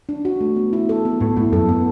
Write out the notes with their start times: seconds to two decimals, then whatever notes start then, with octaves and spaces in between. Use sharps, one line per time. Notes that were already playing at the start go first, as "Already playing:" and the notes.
0.09 D4
0.25 F#4
0.41 A3
0.56 B3
0.73 E4
0.89 A4
1.05 B3
1.20 A2 B3
1.36 A2 E4
1.52 F#2 A4
1.69 B3